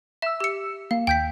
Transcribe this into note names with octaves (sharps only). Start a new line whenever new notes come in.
E5 E6 E7
G4 C#7
A#3 F5
D#2 G5 G6 B6